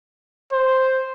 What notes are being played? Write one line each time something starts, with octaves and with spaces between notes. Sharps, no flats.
C5